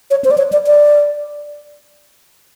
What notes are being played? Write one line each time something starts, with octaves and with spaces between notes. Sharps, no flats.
C#5
C5
D5
C#5
D5
D5